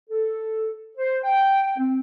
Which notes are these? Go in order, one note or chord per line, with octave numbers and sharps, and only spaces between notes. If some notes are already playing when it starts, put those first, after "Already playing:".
A4
C5
G5
C4